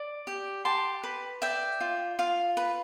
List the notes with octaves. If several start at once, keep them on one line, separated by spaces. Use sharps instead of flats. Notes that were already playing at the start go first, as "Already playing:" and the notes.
Already playing: D5
G4
G4 A5 C6
B4
D5 E5 G5
F4
F4 F5
B4